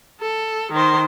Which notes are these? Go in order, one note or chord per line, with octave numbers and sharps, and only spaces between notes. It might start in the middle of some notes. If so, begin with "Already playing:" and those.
A4
D#3 C5